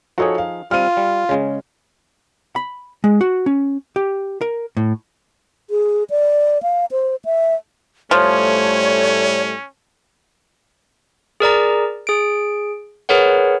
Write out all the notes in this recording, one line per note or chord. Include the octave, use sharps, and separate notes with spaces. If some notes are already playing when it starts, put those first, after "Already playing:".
F3 D#4 F#4 G#4 A4 C#5
F5
G3 C4 F4 F6 D#7
G3
C#3 G#3 C#4
B5
G#3
F#4
C#4
G4
A#4
A2
G#4
D5
F5
C5
E5
A2 F3 G3 A3 C#4 C#5
G#4 A#4 D5 A#5
G#4 D7
G#4 A#4 B4 C#5 F#5